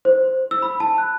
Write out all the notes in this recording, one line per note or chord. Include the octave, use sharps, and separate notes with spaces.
C5
E6
B5
A5
F#6